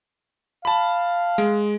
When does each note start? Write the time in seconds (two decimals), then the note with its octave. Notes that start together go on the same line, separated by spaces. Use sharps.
0.65 F5 A5 B5
1.38 G#3